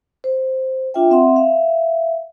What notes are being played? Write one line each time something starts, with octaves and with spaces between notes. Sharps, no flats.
C5
D4 F4 E5 G5
C4 E5 F#5 C6
E5 F5